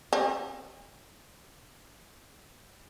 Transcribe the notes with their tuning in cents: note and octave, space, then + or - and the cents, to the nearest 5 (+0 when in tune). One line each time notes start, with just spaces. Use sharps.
C4 +45